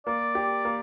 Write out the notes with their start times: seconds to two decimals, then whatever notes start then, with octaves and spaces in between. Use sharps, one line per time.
0.06 A#3 D5
0.35 G4
0.65 A#3